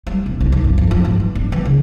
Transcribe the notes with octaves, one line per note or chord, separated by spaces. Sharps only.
G3
E1
C2
D#3
G2
F2
F3
G#2
E3
D4
E3
C#3